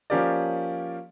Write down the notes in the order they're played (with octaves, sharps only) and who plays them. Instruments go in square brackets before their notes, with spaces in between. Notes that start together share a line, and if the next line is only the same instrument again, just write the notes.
[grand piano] F3 A#3 C#4 G4 A#4 D5